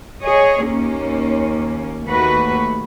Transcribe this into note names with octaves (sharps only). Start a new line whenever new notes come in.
G#4 C#5 D#5
D#2 A#3 C#4
D#2 A3 F#4 B4